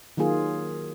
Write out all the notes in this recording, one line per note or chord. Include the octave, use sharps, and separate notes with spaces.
D#3 F#3 A#3 F4 G#4